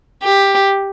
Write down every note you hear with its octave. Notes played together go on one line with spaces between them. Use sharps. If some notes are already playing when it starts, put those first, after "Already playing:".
G4